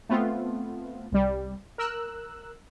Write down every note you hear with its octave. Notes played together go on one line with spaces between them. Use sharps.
A3 B3 C4 F4
C2 G3
A#4 E6 F#6